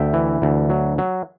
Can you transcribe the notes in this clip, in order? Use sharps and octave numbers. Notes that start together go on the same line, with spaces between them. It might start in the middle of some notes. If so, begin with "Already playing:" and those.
Already playing: D2 E5 G5
E3
D2
F#3
F#3